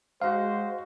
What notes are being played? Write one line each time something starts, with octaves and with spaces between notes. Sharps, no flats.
G#3 D#4 F#4 C5 C#5 F5